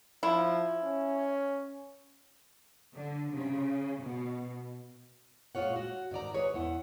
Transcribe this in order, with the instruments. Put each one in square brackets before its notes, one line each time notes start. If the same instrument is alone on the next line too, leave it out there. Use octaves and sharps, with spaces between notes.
[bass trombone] F3 [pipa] E4
[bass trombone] C#4
[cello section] D3
C#3
B2
[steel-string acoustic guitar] A#2 G#3 D#4 F4 C#5 F#5
F#4
G#2 D#3 D5 A#5
G#3 G#4 B4 C#5
E2 E3 F#5